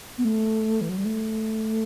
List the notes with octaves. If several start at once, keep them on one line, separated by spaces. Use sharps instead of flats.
B3
A3
E3
F#3
G3
A3